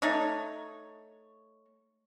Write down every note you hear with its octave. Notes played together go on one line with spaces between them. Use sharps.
A3 D#4 C#5